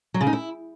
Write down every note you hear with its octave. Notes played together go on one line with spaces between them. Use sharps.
F#3
C#3
D#4
E4